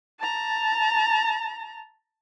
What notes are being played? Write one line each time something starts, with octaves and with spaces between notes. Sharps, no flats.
A5 A#5